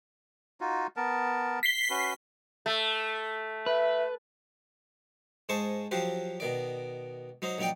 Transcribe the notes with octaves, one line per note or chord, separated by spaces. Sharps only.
D#4 F4 F#4
B3 A#4 A5
B6 C7 G7
C#4 F#4 B4
A3
B4 E5
G#2 G#3 C5 A5 C#6
F3 F#3 F#4 G4 C5
B2 D#3 D5
F#3 D#4 C5
A#1 F#3 D#4 D5 G5